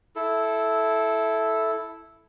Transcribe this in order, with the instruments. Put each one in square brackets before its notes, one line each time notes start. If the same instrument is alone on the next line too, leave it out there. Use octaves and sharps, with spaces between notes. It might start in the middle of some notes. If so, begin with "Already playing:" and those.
[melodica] E4 A4